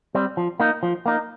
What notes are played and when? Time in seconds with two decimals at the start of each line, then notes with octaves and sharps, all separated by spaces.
0.15 G3 C4
0.37 F3
0.60 A#3 D#4
0.83 F3
1.06 A#3 D#4